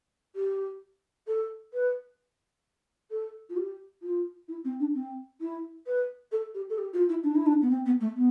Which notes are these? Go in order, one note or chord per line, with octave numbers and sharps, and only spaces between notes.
G4
A4
B4
A4
F4
G4
F4
E4
C4
D4
C4
E4
B4
A4
G4
A4
G4
F4
E4
D4
E4
D4
B3
C4
B3
A3
B3